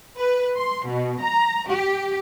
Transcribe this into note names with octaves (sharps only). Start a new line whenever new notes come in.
B4
C6
B2
A#5
G4